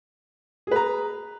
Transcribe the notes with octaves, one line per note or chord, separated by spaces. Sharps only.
G#4 B4 A#5